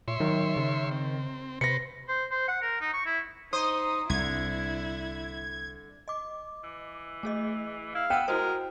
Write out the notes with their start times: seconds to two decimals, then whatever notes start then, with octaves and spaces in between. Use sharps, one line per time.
0.08 A#2 C#5 E5 C6
0.20 D#3 F#3
0.56 C#3
0.91 C4
1.61 C3 B4 C5 A#6 C#7
2.09 C5
2.32 C5
2.48 F#5
2.62 A#4
2.81 D#4
2.94 C#6
3.06 E4
3.53 D#4 C5 D#6
4.10 C2 D3 E4 G#6
6.08 D#5 D6
6.64 E3
7.23 A3 G#4 D#5
7.95 E4 F5
8.10 B3 F#5 G5 E6 E7
8.28 G#3 E4 F#4 A#4 C5